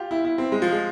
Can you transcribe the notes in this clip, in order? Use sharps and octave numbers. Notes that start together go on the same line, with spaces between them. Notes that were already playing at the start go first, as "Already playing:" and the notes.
Already playing: F4 G4
E4
E4
C4
G#3
F3
G#3